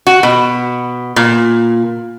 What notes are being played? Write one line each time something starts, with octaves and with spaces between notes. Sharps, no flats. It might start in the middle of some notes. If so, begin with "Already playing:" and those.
F#4
B2
A#2